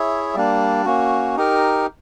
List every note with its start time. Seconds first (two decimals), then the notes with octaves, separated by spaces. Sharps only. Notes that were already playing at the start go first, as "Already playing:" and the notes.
Already playing: E4 G#4 C#5 E5
0.35 G3 A#3 D4
0.85 A#3 C#4 F#4
1.36 D#4 G4 A#4